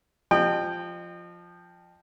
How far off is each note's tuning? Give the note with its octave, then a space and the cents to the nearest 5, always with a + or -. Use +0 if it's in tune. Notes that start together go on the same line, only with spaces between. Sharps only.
F3 +0 D#5 -35 G5 +10